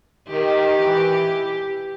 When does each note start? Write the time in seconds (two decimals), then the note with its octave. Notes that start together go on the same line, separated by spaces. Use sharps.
0.28 D#3 G4
0.79 E3